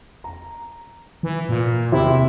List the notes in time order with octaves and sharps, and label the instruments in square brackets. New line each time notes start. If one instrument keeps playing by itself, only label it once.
[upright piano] A#5
[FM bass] E3
A#2
[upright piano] E2 C3 C6 [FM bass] E4